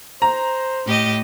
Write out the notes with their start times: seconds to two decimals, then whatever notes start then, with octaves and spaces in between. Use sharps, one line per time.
0.22 C5 A#5
0.86 A2 G4 D#5